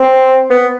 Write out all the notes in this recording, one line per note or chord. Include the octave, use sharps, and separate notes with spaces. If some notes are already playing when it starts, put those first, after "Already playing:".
Already playing: C4
B3